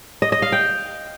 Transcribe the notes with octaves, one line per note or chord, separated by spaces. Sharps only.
D#5
D#5
F5
G5